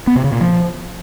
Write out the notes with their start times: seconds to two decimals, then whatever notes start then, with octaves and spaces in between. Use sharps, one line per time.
0.07 B3
0.16 C3
0.24 C#3
0.32 A#2
0.41 F3